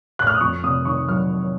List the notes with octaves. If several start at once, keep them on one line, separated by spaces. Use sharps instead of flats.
F#6
F6
D#6
F2 C#6
C3 D#6
D#3 C#6
F#3 F6